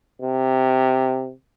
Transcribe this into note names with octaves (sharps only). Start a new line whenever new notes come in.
C3